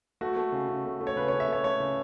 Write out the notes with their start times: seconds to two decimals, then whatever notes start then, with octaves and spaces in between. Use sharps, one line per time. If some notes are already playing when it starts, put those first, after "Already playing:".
0.21 A3 F#4
0.36 A3
0.52 C#3
0.69 C#3
0.85 A3
1.01 A3
1.07 C#5
1.16 C#3 B4
1.28 C#5
1.33 C#3
1.40 E5
1.48 A3 C#5
1.64 A3 C#5
1.80 C#3